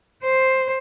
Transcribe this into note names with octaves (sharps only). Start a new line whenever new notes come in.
C5